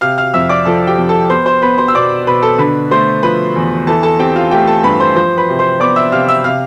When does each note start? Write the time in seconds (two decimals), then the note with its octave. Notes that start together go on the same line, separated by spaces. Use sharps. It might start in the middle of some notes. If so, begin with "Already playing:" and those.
0.01 C3 F5 F6
0.18 F5 F6
0.34 F2 E5 E6
0.49 D5 D6
0.65 F3 A4 A5
0.87 G4 G5
0.98 F2
1.09 A4 A5
1.30 B3 C5 C6
1.46 C5 C6
1.62 B3 B4 B5
1.78 C5 C6
1.88 E6
1.95 B2 D5 D6
2.27 B2 B4 B5
2.42 A4 A5
2.58 D3 B4 B5
2.91 A3 C5 C6
3.23 F3 B4 B5
3.56 E2
3.87 E3 A4 A5
4.03 A4 A5
4.19 C4 G4 G5
4.36 F4 F5
4.51 A3 G4 G5
4.67 A4 A5
4.84 G2 B4 B5
5.00 C5 C6
5.16 F3 C5 C6
5.37 B4 B5
5.49 C3
5.59 C5 C6
5.80 B3 D5 D6
5.96 E5 E6
6.12 C3 F5 F6
6.28 E5 E6
6.44 C3 F5 F6